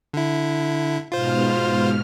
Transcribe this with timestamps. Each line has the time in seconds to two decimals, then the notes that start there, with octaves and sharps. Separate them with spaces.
0.14 D3 E4
1.12 G#2 B2 F4 C5 F6